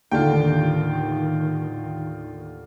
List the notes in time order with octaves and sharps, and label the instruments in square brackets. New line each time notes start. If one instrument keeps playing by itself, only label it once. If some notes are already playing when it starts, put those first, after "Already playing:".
[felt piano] D#2 D3 [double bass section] A2 D#3 [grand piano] F4 G5